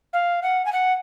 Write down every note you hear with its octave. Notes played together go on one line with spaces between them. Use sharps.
F5
F#5
G#5
F#5